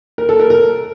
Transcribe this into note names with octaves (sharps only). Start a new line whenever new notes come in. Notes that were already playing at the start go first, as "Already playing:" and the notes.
A#4
A4
A#4
A#4